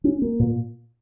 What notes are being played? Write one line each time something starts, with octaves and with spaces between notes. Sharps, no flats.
C#4
A#3
A#2